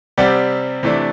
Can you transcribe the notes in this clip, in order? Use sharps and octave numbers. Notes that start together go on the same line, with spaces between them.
C3 G3 C4 D5 F#5
C3 E3 A3 D4